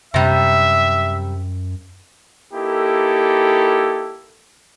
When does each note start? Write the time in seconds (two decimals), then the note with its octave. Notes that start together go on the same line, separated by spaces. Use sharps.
0.14 F#2 C3 G3 E5
2.54 A#3 D#4 E4 G4 A4